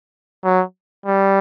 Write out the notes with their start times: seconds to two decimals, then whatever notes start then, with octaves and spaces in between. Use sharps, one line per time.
0.44 F#3
1.06 G3